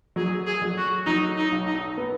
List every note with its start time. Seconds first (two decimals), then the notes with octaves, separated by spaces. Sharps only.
0.16 F#3 G#4
0.47 G#4
0.62 F#3
0.77 F#4
1.06 F#3 D#4
1.37 D#4
1.52 B1
1.67 D#4
1.97 B3